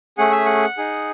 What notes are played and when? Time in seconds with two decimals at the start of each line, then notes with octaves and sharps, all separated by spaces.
0.18 A3 C#4 G#4 F#5
0.32 E5
0.46 F#5
0.77 D#4 G#4